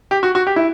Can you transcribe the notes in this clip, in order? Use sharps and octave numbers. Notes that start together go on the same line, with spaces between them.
G4
F#4
F#4
G4
E4